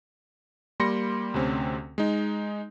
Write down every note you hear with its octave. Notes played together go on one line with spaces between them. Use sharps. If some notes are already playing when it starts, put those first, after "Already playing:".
G3 A#3 B5 C6 A#6 C#7
D2 C3 C4 C#4
G#3 D#4